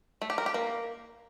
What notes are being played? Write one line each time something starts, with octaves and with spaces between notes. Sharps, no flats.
A3
G4
A#4
G4
A#3